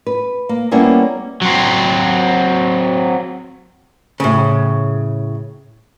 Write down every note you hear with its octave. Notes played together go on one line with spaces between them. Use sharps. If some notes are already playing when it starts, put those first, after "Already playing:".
B4
A#3
G3 A#3 B3 C#4 E4 G#4
F#3 C4
A2 C#3